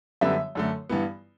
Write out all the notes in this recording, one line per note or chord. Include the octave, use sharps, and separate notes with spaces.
F#2 D3 G3 B3 E5
F#2 D3 A3
G2 E3 B3